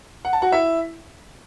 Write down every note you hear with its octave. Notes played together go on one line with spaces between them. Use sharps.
F#5
A5
F#4 F#5
E4 E5